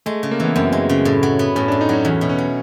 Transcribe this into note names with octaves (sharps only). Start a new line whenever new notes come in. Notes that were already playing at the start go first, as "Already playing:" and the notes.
G#3 A3
C#3
A#3
E3 B3
F#2 C4
G#3
C#3
A2
F#3
B3
A2 C#4
A2 D4
D#4
F#3 C#4
E2 C#4
B2
C#4
F#3